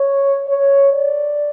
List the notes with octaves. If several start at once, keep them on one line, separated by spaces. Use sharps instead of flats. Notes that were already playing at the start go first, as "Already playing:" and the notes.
Already playing: C#5
C#5
D5